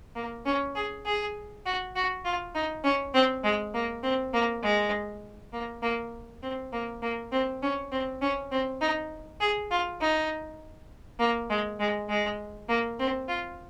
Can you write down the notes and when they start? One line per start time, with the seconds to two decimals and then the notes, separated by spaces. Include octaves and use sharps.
0.15 A#3
0.46 C#4
0.76 G#4
1.06 G#4
1.66 F#4
1.96 F#4
2.25 F4
2.55 D#4
2.84 C#4
3.14 C4
3.44 G#3
3.74 A#3
4.03 C4
4.34 A#3
4.63 G#3
5.53 A#3
5.82 A#3
6.43 C4
6.73 A#3
7.02 A#3
7.32 C4
7.63 C#4
7.92 C4
8.22 C#4
8.52 C4
8.81 D#4
9.40 G#4
9.71 F4
10.01 D#4
11.20 A#3
11.50 G#3
11.80 G#3
12.09 G#3
12.69 A#3
12.99 C4
13.28 F4